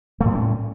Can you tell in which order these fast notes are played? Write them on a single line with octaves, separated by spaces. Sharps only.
A3 A2 G3 C#4